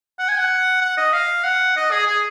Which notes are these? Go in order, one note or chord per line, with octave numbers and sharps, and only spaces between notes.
F#5
G#5
F#5
F#5
D#5
F5
F#5
D#5
G#4
G#4